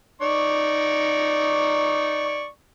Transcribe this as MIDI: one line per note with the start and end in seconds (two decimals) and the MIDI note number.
0.21 2.47 63
0.21 2.47 74
0.21 2.47 85